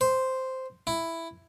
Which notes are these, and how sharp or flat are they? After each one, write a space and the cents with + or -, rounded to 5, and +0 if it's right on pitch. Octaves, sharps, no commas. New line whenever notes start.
C5 -5
E4 +5